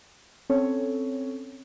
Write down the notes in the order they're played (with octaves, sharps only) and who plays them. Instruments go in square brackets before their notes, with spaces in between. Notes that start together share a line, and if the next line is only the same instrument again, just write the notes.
[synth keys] C4 C#4 A4 C#5